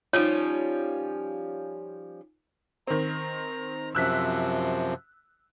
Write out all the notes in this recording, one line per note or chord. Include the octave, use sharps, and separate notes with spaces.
F3 G3 C#4 D#4 F4 C#5
D#3 C4 A#5
F#2 C3 F3 E6 F#6 B6